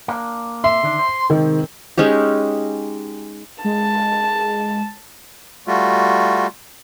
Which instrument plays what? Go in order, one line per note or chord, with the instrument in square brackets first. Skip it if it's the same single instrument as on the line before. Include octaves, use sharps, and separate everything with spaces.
[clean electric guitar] A#3 D4
[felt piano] E5 [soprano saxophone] C6
[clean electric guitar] D3 D#3 D4
C5
[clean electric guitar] C3 G#3 C4 [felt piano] D#3
[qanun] G#3 C#4 D#4 G4
[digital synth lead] G#3 [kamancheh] A5
[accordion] G3 A3 F4 F#4